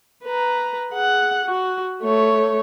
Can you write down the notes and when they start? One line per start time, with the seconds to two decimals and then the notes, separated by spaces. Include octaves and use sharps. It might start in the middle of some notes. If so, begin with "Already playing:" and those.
0.24 B4 A#5
0.91 G#4 F#5
1.45 F#4
2.02 A3 C#5